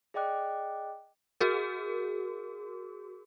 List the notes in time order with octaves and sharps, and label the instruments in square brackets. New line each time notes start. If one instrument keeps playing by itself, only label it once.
[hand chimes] G#4 D5 D#5 G5 D6 F#6
[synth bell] F#4 G#4 A#4